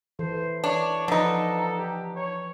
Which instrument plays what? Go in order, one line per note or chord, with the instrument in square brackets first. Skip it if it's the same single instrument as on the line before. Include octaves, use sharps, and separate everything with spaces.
[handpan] E3 A4 [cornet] C5
[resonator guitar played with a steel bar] D4 [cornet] C#5
[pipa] D3 D#4 [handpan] F3 B4 [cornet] A4
[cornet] G4
C#5